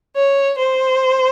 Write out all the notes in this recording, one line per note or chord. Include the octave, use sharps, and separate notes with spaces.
C#5
C5